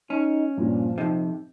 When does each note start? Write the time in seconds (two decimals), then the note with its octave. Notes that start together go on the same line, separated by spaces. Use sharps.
0.10 C#4 D#4
0.58 G2 A#2 F3
0.98 F2 C3 D#4